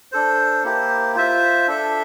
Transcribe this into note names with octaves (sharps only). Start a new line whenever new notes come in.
D4 A4 C5
A#3 E4 G4 C5
F4 C5 E5
D4 A4 E5